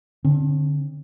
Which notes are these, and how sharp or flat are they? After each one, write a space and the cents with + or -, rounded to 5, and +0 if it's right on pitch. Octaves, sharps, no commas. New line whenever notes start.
D3 +0 C4 +35